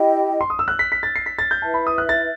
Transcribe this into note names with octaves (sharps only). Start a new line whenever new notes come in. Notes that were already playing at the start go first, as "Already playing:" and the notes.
Already playing: E4 G4 D#5 G5
C6
D#6
E6
F#6
B6
B6
A6
C7
B6
A6
G6
E4 B4 E5 A5
B5
D#6
F#6
A6